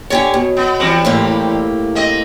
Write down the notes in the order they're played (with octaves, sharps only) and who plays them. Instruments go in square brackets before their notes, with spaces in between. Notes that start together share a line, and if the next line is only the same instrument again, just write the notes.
[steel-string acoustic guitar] D3 G4 G#5 [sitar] C#5
[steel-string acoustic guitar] B2
[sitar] B3
E3 G3 C4
[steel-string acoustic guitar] A2 A#3 G4
[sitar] C4 D#5